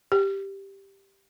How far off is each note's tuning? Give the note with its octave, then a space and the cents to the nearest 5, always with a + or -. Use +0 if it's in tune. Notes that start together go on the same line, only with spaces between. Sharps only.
G4 +0